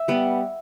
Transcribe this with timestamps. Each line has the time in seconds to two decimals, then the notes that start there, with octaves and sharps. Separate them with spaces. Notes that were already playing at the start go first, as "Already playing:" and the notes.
Already playing: E5
0.08 G3 B3